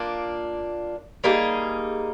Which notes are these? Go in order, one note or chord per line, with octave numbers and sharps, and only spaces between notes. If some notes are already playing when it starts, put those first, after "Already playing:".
Already playing: A#3 D4 F4
G3 A#3 D#4 G#4